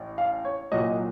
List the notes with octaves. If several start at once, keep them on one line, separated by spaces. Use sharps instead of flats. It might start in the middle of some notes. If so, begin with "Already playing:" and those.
Already playing: A1
F5
C#5
C2 A#2 F#3 D#5